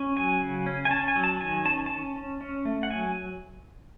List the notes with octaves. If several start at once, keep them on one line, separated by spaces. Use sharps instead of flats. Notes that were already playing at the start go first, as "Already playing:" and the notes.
Already playing: C#4
F#3 G#5
C#3
C#4
G#5
C#4 A5
G#5
F#3
A5
D#3 G#5
C#4 A5
C#4 A5
C#4
C#4
A3
F#5
F#3 G#5